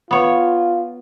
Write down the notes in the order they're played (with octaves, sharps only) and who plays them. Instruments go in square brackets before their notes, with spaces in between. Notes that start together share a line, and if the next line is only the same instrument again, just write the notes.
[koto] B3 C#5 [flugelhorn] F4